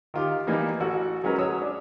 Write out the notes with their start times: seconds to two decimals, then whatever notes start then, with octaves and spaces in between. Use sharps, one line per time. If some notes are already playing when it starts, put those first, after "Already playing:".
0.14 D#3 F4 G4
0.47 E3 G3 A#3 D#4
0.80 A1 F#4 A4
1.24 F#3 G#3 C#4 A#4 B4
1.38 F#3 C#5 D#6 E6
1.62 D4